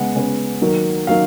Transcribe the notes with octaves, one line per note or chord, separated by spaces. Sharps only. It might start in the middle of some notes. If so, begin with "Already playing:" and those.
Already playing: C#3 G#3 B3 F#5
C#3 G#3 B3
D#3 F#3 A#3
D#3 F#3 A#3 F5